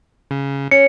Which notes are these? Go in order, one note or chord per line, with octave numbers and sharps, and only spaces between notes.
C#3
C#4 C#5 C#7